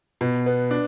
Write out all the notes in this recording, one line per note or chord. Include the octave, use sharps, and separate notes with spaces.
B2
B3
D4